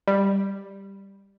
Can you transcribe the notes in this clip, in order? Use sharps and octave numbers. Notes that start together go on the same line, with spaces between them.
G3